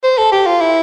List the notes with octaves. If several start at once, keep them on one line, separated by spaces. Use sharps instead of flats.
C5
A4
G4
F4
E4